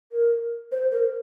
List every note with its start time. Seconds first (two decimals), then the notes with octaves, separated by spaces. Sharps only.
0.12 A#4
0.72 C5
0.92 A#4